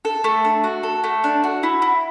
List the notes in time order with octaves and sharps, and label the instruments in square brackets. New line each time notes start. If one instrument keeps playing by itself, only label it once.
[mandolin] A4
A3
D4
F#4
A4
A3
D4
F#4
E4
E4